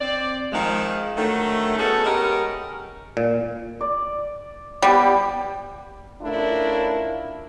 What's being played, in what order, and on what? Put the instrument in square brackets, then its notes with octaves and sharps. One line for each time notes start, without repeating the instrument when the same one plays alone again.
[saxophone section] C4 D5
D#3 F3 G#3
D3 D#3 F#3 A3
B3 C#4 D#4 F#4 G#4 A4
G#3 B3 C#4 D#4 G4 A#4
[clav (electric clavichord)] A#2
[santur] D5
[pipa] G3 [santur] B3 G4
[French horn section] A3 C#4 D4 E4 F4 A#4